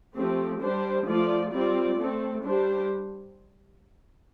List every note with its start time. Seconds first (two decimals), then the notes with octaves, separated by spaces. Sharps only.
0.15 F3 A3 C4 G4
0.59 G3 D4 G4 C5
1.05 F3 A3 F4 D5
1.51 G3 C4 F4 D5
1.97 A3 C4 A4
2.43 G3 D4 G4 C5